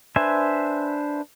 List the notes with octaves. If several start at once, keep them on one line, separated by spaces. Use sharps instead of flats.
D4 B4 C5 E5 G#5